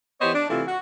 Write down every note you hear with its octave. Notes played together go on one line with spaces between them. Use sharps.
E3 B3 G4 C5 C#5 D#5
D4
C3 E3 A3 E4 F4
F#4